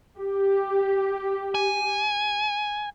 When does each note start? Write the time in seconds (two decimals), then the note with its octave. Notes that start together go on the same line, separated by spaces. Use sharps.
0.19 G4
1.55 G#5